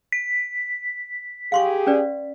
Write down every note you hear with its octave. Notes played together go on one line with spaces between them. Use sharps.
B6
G4 G#4 F5 C6 C#6
C#4 B4 D5